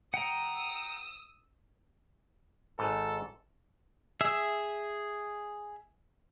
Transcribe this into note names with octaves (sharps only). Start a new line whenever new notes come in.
F#5 G5 A#5 D#6 E6
G#1 G#2 A4
G#4 E5 E6